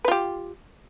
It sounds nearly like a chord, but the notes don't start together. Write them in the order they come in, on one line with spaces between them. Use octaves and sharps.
B4 F4 G4